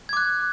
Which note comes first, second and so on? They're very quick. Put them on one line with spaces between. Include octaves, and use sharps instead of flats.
G#6 D6 F#6